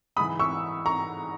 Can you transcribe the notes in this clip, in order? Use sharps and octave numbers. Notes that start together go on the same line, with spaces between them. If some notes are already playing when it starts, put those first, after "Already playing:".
G#2 E3 B5 D#6
C#6 E6
A#5 C#6